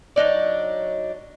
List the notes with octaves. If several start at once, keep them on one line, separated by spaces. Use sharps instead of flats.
F#3 D4 D#4 D5